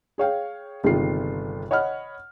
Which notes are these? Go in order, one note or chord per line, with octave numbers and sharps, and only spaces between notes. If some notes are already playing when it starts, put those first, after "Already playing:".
G#4 C#5 F5 G5
G1 C3 D#3 G#3 F4 C7
C#5 D#5 F#5 B5 F6